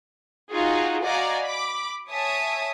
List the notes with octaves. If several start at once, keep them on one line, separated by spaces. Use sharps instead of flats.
D#4 F4 F#4 G#4
F#4 D5 D#5 F5 G#5 A#5
B5 D6
C#5 E5 G#5 A5 D#6